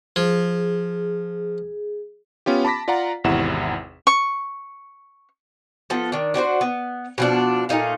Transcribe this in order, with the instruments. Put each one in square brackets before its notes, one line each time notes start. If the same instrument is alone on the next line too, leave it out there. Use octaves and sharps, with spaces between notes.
[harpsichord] F3 [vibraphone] G#4
[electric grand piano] B3 C#4 F4 G4
A5 B5 D6 A#6 B6
F4 D5 F5 F#5 A#5
G#1 E2 C3 E4 F#5 E7
[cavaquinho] C#6
[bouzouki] F3 B3 A4
D#3 D4
D4 F#4 B4 C5
B3
B2 F3 D4
A#2 A3 D#4 F5